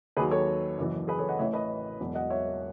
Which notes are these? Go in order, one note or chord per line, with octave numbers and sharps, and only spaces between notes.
D#2 D#3 F#3 G#4 B4
A4 C#5
F#1 F#2 E3
G#4 B4
A4 C#5
D#5 F#5
A1 A2 E3 C#5 E5
B4 D#5
E1 E2 B2 F#3
D#5 F#5
C#5 E5